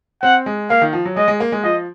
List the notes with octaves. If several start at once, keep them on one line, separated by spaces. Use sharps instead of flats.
C4 F#5
G#3
A#3 F5
D#3
F3
F#3
G#3 D#5
G#3
A#3
G#3
F3 D#5